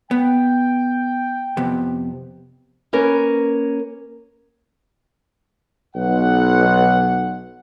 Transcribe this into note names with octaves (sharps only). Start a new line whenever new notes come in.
B3 G5
F2 C3 B3
A#3 C#4 A#4 B4
B1 F#5